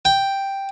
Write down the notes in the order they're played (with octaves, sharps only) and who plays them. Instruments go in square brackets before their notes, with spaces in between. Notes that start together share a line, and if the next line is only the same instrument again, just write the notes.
[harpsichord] G5